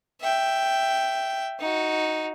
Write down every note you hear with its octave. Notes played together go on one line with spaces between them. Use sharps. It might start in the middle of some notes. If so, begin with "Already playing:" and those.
E5 G5
D#4 F#4